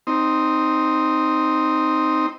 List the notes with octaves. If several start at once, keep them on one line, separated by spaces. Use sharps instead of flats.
C4 D#4